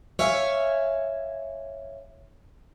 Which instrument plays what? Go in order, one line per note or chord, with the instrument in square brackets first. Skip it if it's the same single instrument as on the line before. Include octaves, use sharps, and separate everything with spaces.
[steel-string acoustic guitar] C#5 E5 F5 G#5